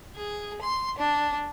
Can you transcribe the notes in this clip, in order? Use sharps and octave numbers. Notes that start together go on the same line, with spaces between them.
G#4
C6
D4